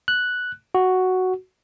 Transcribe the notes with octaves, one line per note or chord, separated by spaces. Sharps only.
F#6
F#4